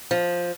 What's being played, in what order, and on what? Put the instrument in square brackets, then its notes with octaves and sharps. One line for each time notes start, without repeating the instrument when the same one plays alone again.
[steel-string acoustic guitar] F3